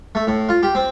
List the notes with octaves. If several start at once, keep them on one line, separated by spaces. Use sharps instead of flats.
A3
A2
F4
G4
C4